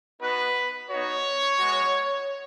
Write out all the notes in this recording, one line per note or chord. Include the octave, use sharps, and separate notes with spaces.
B3 D#4 F#4 B4
B3 D#4 F#4 C#5
G#3 B3 F#4